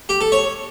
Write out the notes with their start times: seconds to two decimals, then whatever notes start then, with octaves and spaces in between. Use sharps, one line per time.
0.09 G4
0.21 A4
0.32 C#5